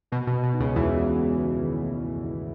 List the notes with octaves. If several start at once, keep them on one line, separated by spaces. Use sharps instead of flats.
B2 F#4
B2
B3
B2
D#4
C#2 C#3
E2 E3 G#3
F#4
B3
E4
D#3
A3
F#2
E4